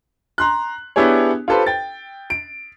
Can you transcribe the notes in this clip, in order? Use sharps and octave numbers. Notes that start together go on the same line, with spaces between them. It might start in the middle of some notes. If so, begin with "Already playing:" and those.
A#5 C6 F#6
B3 D4 E4 G4 G#4 C#5
F4 G4 A4 B4 C5
G5 A6
D7